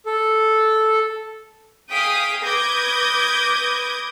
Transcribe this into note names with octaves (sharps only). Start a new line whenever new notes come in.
A4
G#4 F5 G5 D#6 B6 D7
B4 D6 D#6 G6 G#6 A#6